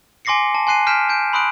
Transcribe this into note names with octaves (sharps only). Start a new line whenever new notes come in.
G#5 C6 D6 A#6 C7 C#7
A5
G#5 C6 F#6 C7 D#7
F6 G6 B6 D7 E7
G#5 G6 D7
B5 C6 D#6 F#6 D7 F#7